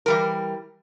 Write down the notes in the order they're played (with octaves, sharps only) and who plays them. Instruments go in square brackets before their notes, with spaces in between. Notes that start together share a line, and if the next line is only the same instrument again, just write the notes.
[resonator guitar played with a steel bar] E3 G3 A#4